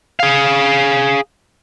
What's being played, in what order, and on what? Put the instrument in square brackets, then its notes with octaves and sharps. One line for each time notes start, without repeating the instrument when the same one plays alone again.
[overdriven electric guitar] G#4 F5